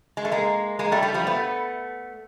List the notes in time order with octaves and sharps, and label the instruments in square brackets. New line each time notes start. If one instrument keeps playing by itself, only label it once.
[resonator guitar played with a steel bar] G#3
A3
G#3 A#3
G#3 A#3
G3 A3
G3 A3
F3 G3
A3 B3